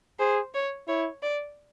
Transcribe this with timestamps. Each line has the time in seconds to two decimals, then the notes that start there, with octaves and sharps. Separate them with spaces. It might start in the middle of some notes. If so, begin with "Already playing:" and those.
0.19 G#4 C5
0.54 C#5
0.88 E4 C#5
1.22 D5